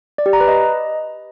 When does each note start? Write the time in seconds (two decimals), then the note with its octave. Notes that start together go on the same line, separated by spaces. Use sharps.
0.18 D5
0.26 G4
0.33 A#5
0.41 B4
0.48 D#5